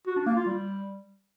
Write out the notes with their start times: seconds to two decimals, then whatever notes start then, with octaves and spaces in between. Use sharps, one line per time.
0.07 F#4
0.17 D4
0.26 A#3
0.36 F4
0.46 G3